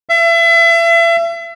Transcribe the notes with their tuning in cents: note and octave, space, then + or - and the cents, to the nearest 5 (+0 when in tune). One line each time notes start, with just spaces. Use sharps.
E5 +35